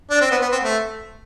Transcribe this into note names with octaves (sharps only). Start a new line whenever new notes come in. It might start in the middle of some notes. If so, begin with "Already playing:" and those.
D4
C4
B3
B3
C4
A3